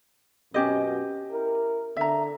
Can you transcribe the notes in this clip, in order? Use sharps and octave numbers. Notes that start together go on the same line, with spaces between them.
F#2 B2 C#4 G4 D#5
E4 A#4
D3 E5 A#5